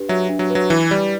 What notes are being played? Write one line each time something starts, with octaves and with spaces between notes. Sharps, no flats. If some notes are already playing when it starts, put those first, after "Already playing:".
Already playing: D4 G4 B4
F#3 E5
D4
F#3
B4
F#3
E3 E4
G3 D5